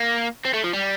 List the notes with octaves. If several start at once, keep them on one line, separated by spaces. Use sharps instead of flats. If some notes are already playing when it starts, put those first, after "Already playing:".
Already playing: A#3
C4
A3
F3
G3